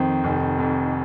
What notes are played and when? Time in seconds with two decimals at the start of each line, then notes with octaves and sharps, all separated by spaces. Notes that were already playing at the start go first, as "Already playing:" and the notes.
Already playing: F2 D#3 C5
0.24 F1
0.59 F2